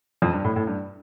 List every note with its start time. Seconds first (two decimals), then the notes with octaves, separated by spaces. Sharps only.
0.22 F2 F3
0.33 G2
0.44 A2
0.56 A2
0.67 G2